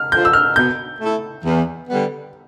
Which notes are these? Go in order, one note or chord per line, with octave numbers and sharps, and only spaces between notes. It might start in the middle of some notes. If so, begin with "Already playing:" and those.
Already playing: F6
D3 F3 G6
E6
F6
B2 G6
A3 E4 A4
E2
D3 G3 B3